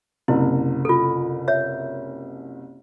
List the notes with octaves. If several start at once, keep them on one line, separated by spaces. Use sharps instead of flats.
F#1 C2 E4
F4 A4
C#5 E5